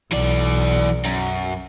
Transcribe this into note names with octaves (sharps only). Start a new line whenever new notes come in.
B1 E3 D5
F#2